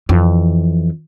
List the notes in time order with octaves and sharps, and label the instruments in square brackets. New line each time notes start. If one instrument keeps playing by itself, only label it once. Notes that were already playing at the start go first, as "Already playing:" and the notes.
[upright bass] F2 E3